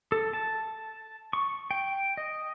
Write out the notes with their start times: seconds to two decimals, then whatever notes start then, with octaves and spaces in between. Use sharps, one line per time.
0.12 A4
0.33 A5
1.33 C#6
1.71 G5
2.17 D#5